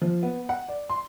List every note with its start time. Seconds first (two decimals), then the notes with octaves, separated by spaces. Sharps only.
0.02 F3
0.23 B3
0.49 F#5
0.69 D5
0.89 C6